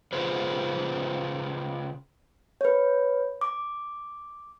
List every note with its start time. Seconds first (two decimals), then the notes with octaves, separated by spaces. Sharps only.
0.13 C#3 F4 G#4 B4 C5
2.61 B4 C#5
3.41 D6